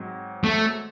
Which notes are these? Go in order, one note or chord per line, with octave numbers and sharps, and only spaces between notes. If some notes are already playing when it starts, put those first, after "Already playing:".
Already playing: G#2 F#3 C4
A3